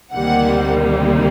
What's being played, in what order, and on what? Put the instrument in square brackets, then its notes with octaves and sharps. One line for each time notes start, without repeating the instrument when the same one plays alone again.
[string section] D2 C3 D#3 G3 A#3 F#5